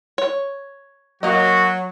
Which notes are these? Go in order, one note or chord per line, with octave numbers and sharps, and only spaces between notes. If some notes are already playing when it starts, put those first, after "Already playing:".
C#5
F#3 A#3 F#4 D#5